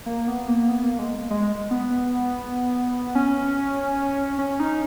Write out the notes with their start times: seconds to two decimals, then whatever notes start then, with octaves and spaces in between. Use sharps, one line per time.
0.06 A#3
0.28 B3
0.48 A#3
0.69 B3
0.84 A#3
0.99 G#3
1.30 G#3
1.71 B3
3.15 C#4
4.39 C#4
4.60 D#4